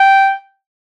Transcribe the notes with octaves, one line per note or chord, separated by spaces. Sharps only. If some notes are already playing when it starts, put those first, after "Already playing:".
Already playing: G5